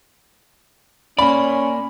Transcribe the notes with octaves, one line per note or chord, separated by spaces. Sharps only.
A#3 C#4 D5 B5